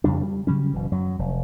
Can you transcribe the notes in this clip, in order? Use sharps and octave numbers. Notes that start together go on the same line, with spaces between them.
F2 C#3 G3 D4
G3
C#3 F#3 G3 C#4
F#1 B2 E3
F#2 F#3
F1